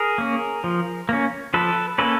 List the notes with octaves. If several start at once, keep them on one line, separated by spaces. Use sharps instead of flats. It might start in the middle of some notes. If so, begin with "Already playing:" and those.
Already playing: G#4 A#4
A#3 C#4
F3
A#3 C#4
F3 A4 B4
A#3 C#4 A4 B4